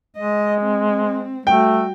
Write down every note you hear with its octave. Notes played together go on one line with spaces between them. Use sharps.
G#3 D#5
C4
G3 A3 F#4 G5